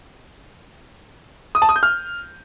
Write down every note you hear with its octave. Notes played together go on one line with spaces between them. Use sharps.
D#6
A5
D#6
G6
F6